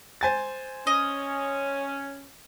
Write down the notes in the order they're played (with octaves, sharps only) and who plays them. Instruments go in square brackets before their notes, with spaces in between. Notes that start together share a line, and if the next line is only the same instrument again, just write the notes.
[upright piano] C5 G#5 A6
[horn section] C#4 [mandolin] D#5